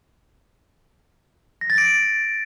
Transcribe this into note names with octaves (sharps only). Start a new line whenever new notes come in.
A#6
A6
D7